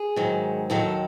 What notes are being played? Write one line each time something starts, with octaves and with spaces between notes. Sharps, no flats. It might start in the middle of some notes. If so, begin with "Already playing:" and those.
Already playing: G#4
G#2 D#3 F#3
D#2 D#3 F#3 A4